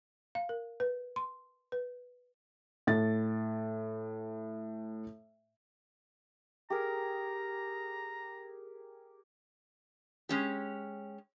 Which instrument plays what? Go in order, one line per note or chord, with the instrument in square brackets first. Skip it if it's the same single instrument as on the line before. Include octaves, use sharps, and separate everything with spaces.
[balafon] F5
A#4
B4
C6
B4
[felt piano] A2 A6
[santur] G4 G#4 A#4 [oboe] A#5
[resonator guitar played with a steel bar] G#3 C#4 G4